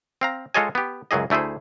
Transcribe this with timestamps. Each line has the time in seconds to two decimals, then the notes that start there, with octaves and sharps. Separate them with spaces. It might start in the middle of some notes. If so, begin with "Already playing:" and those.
0.21 C4 F5 A#5
0.54 G#3 F4 A4 C#5 D#5 G#5
0.75 B3 G4
1.11 C#2 F#2 F#3 G#4 D#5
1.30 D2 A3 E4 G#4 C5